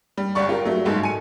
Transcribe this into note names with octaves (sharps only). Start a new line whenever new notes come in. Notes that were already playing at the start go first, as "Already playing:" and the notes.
G3
G1 G3 D5 F#5 C#6
F4 G4 A#4
F#3 A3
G1 G#2 A4
G#5 C#7 D#7